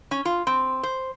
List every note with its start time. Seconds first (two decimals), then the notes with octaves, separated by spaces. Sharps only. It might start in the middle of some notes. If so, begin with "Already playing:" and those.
0.11 C#4
0.25 F4
0.47 C4
0.83 C5